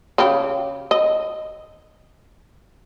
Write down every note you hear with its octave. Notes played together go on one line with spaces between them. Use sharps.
C#3 G4
D#5